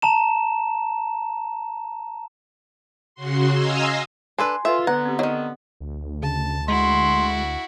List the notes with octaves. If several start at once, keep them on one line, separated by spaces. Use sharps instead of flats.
A5 A#5 E7
C#3 F#4 C6
D#5 F5 G#5 A#5 C6 E6
D4 A4 B4 G#5 C6
F4 A4 B4 E5
D3 B3 B4 F#5 A#5
C4 G4
D#3 F#3 D#5
D2
C#3 A5
G#3 E4 F#4 C6